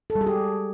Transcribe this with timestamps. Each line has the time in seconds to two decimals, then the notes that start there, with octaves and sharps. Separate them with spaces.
0.10 A4
0.15 G3
0.21 G#4
0.27 G4